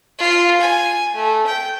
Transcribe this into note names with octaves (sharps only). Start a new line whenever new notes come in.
F4
G#5
A3
G5